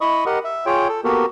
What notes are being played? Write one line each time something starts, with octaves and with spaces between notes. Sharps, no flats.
E4 D#5 B5 C#6 D#6
G4 A#4 D#5 F#5
E5
F4 G#4 C#5 G5
A4
A#3 B3 F#4 G4 A4 A#4